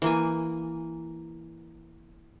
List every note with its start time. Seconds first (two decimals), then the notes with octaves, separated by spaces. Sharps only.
0.02 E3 A#3 G#5